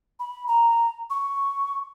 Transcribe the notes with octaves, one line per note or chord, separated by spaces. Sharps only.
B5
A#5
C#6